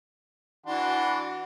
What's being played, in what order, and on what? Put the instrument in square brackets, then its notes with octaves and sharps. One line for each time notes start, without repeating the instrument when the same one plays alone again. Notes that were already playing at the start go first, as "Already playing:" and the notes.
[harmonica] E3 D4 C6 [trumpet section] F#4 F#5